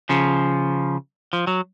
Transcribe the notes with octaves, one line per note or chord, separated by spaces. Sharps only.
C#3 F3
F3
F#3